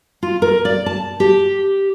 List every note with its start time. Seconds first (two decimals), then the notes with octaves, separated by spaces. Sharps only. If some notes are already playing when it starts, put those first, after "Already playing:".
0.23 F4
0.42 A#4
0.65 D5
0.86 A5
1.20 G4